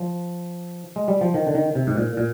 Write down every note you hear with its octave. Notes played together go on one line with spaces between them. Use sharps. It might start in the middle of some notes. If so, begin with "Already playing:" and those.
Already playing: F3
G#3
G3
F3
D#3
D3
D#3
C3
G#2
A#2
A#2